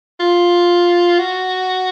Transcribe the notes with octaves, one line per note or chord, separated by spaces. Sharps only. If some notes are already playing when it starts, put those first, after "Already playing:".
F4
F#4